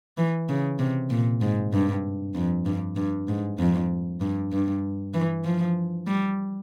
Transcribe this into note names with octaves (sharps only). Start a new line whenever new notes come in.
E3
C#3
C3
A#2
G#2
G2
F2
G2
G2
G#2
F2
G2
G2
E3
F3
G3